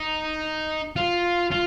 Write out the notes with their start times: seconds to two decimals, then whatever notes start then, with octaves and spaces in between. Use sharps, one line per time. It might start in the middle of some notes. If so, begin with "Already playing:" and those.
Already playing: D#4
0.96 F4
1.51 F4